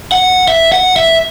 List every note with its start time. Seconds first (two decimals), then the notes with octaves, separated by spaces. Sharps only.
0.12 F#5
0.48 E5
0.72 F#5
0.96 E5